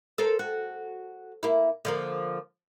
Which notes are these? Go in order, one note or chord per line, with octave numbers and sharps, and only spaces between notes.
A4 A#4 C5
F#4
A#3 E4
D3 F3 A#3